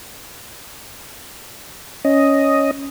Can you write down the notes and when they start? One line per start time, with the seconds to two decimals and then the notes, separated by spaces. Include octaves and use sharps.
2.05 C#4 D#5